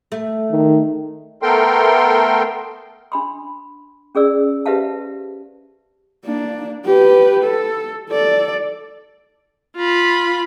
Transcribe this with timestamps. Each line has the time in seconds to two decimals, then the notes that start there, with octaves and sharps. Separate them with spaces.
0.12 A3
0.51 D#3
1.42 A3 B3 A4 A#4 G5 C6
3.12 D4 B5 C6
4.15 C#4 G#4 D5 E6
4.66 G4 B4 C5 E5 F5 A5
6.25 A#3 D4
6.86 G4 B4
7.44 A4
8.10 A4 D5
9.76 F4 B5